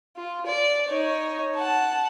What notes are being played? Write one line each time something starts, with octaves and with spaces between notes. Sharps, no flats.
F4
D5
D#4 C#5
F#5 A5